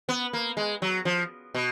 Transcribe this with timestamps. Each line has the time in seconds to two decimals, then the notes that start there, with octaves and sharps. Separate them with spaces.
0.09 B3
0.33 A#3
0.57 G#3
0.82 F#3
1.05 F3
1.54 B2